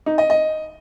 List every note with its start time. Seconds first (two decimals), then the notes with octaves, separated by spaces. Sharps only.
0.06 D#4
0.18 D#5
0.30 D#5